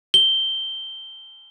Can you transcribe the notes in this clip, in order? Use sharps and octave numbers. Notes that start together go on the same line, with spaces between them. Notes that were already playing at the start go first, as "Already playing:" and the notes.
G7